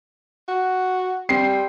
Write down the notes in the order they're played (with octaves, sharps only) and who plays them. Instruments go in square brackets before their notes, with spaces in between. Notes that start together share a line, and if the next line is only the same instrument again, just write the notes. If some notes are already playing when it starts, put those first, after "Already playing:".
[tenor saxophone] F#4
[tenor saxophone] G3 [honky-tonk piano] C4 C7